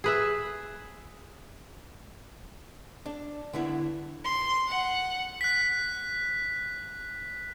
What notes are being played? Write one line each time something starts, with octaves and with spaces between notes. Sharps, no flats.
G#4 B4 E5
D4
D3 B3 E4
C6
F#5
F#6 B6